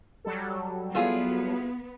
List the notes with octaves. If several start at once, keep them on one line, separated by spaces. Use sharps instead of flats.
F#3 G3 A4
B3 E4 F4 G#4